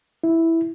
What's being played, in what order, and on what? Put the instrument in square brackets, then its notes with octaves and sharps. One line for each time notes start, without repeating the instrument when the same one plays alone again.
[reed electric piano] E4